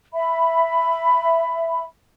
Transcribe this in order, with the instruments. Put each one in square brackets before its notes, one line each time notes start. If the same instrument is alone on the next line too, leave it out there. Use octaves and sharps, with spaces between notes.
[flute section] E5 B5